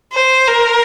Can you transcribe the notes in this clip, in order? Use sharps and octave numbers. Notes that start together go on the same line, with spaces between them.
C5
A#4